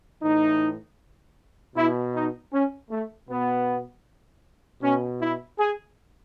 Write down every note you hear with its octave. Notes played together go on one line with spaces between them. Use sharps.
A2 E3 D#4
B2 E4
D#4
C#4
A3
B2 B3
B2 C#4
E4
G#4